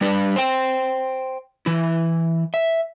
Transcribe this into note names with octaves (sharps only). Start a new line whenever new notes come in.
G3 D4 B4
C5 G5
E3 E4
E5